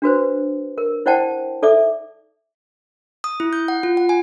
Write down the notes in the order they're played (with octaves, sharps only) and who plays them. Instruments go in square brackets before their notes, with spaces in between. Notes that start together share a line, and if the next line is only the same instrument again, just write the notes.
[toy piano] D4 F#4 B4 C5
A#4
E4 C5 D5 F#5 G5 A5
D#4 A4 D5 E5 D6
[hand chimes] D#6
E4
G6
F#5
F4
F#5
G#5